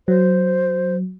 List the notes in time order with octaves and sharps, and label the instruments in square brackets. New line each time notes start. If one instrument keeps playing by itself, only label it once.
[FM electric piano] F#3 [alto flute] C5